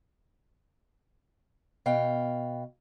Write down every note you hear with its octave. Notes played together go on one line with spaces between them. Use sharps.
B2 F5 G5